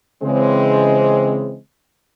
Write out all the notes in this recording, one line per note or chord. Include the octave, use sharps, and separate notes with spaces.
C#3 E3 G#3 C4